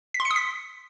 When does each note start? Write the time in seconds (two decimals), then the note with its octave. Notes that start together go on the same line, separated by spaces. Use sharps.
0.14 B6
0.20 C6
0.25 C#7
0.31 D#6
0.36 B6